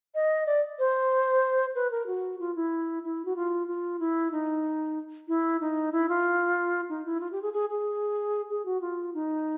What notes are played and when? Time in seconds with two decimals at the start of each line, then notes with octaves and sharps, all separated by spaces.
0.15 D#5
0.47 D5
0.79 C5
1.75 B4
1.91 A#4
2.07 F#4
2.40 F4
2.56 E4
3.04 E4
3.25 F#4
3.36 F4
3.68 F4
4.00 E4
4.32 D#4
5.28 E4
5.61 D#4
5.92 E4
6.09 F4
6.89 D#4
7.06 E4
7.21 F4
7.32 G4
7.42 G#4
7.53 G#4
7.70 G#4
8.50 G#4
8.65 F#4
8.81 F4
9.14 D#4